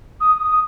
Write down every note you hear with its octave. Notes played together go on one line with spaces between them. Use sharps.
D#6
D#6